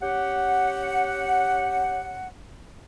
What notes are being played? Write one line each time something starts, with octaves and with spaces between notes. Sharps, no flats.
C#4 G4 F#5